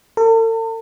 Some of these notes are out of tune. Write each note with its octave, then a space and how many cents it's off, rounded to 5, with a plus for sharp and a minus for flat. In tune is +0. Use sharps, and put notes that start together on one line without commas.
A4 +45